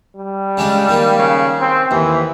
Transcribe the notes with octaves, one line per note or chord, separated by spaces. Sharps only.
G3
C#3 G#3 D4
D#3 A#3
C#3
C4
D#2 E3